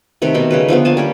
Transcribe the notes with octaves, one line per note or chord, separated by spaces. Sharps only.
C3 D#3 A3 B4
B2 D#4 B5 C6
C#3 G3 B4
D3 F3 A3 B3
F3 A#3 G#5 A5
G3 C#4 G4